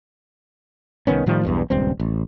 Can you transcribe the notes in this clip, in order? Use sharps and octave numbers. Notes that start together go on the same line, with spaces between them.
C2 D#3 B3 C#4
A2 D#3 F3 G3
B1 E2 G2
D#1 C#2 G2 C4
A1